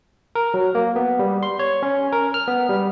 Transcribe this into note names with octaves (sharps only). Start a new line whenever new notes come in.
A#4
F#3
A#3
B3
G3
C6
C#5
C#4
A#4
F6
B3
G3